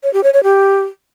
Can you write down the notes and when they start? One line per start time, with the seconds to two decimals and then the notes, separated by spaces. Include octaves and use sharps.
0.03 C#5
0.13 G4
0.23 C#5
0.33 C#5
0.43 G4